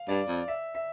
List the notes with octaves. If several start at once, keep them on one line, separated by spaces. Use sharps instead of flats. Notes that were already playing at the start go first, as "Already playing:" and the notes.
Already playing: F5
G2 D5
F2
E5
E5